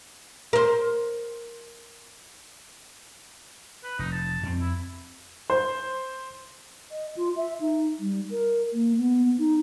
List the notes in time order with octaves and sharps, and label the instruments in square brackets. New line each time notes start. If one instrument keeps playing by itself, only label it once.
[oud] A#4 C5
[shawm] B4
[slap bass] F1 [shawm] D#4
[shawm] A5
[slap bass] F2 C4
[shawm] E4
[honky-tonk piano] C5
[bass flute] D#5
F4
E5
D#4
G3
A#4
A#3
B3
D#4